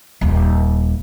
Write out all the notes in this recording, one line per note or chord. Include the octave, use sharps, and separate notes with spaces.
D#1 D#2